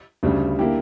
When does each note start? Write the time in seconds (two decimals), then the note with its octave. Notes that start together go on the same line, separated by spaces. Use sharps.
0.23 D2 C#3 G3
0.59 D3 A#3 E4 G4